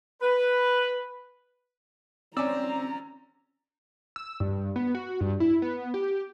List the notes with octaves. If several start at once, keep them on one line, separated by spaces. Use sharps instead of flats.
B4
C4 C#4 D5 A#5 E6
E6
G2
B3
F#4
G2
E4
B3
G4